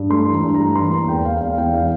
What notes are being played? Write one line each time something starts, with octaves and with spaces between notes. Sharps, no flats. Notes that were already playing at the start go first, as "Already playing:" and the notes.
Already playing: G2
A3 C6
E3
A#5
G2
A3 A#5
E3 C6
A#3 A#5
E2 G5
E2 F5
E2 F5
E2 G5
E3 F5